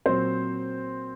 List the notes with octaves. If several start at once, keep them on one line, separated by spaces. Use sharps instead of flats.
A#2 F#3 C4 C5